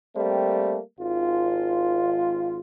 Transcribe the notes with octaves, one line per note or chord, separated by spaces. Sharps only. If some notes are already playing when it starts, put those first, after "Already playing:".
G3 A3 A#3 C4
G#1 F4